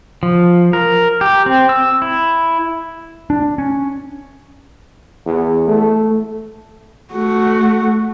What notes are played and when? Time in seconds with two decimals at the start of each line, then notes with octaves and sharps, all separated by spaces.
0.23 F3
0.73 A#4
1.21 G4
1.46 C4
1.69 E6
2.02 E4
3.30 D4
3.58 C#4
5.26 E2
5.68 A3
7.13 A3 F#4